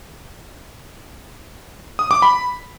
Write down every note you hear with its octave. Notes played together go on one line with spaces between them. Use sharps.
D#6
D6
B5